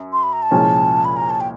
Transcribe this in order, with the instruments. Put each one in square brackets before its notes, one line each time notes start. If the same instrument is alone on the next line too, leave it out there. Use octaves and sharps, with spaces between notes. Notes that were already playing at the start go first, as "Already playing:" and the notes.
Already playing: [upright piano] F#2
[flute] C6
B5
A#5
A5
[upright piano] C2 A#2 F3 G#3 C#4
[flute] B5
A#5
A5
G5